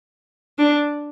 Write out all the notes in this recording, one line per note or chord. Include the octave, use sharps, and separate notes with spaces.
D4